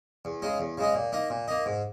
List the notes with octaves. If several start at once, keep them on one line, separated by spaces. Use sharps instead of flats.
E2
C#3 G#3 D#4
E2
C#3 G#3 D#4
A#2
A#3 D#4
A#2
A#3 D#4
G#2